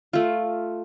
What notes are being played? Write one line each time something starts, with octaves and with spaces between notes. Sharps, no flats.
A3 F4